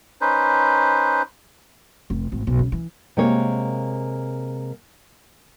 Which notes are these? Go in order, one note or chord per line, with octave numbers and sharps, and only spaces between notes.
C#4 D#4 B4 C5
F1
G#1
B1
C#3
E3
C3 G#3 A#3 C#5 F5